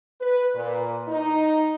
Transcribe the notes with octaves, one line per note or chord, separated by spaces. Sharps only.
B4
A#2
D#4